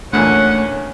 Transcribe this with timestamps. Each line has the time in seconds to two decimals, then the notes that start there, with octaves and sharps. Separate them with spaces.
0.13 E2 A#2 D3 A3 C#4 F#5